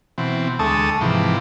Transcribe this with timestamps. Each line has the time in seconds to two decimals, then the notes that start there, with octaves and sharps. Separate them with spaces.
0.18 B2 E3 C4
0.59 D2 G#3 A4 A5 C#6 D#6
1.01 G#2 C3 E3 F3